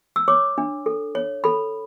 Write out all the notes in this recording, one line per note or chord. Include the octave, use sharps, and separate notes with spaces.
E6
C#5 D6
D4
A4
C#5
A4 B5